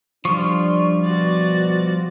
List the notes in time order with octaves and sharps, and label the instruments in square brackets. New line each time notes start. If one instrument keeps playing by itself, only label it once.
[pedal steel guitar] F3 G3 F4 [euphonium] D4 [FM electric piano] C#6
[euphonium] B2 [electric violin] F#4 D5